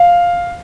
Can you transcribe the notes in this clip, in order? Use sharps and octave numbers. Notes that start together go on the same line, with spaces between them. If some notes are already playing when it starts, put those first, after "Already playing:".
Already playing: F5